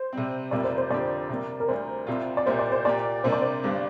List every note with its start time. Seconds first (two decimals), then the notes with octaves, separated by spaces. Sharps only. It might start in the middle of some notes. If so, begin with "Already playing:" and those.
Already playing: C5
0.13 C3 G3 C4
0.51 F1 F2 C3 G3 A#3 D5
0.64 C5
0.78 C5
0.90 F2 D3 A#3 D4 G4 D5
1.29 C3 G3 A#3
1.60 A#4
1.68 D2 D3 G3 C5
2.07 C2 C3 G3 C4 F4
2.37 D5
2.46 C2 A#2 A#3 G4 C5
2.59 D5
2.72 C5
2.85 A#2 A#3 G4 D5
3.24 C3 G3 A#3 D4 C5
3.33 D5
3.41 C5
3.63 G1 G2 G3 D4